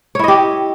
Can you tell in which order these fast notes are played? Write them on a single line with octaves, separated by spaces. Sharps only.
C#5 E4 D#5 G4